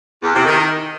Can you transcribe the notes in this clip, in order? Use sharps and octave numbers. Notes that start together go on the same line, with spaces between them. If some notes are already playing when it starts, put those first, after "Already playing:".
E2
C3
D#3